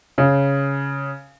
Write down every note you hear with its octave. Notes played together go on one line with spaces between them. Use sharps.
C#3